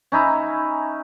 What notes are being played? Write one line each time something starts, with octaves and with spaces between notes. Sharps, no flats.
C#4 D#4 E4 A#5